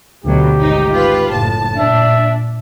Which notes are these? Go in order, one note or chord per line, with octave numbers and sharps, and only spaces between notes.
D2 B2 F#3 G4
G#1 D#4
F4 B4
F#1 A2 A5
A#2 D4 E5